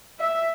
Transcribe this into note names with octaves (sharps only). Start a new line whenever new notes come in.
E5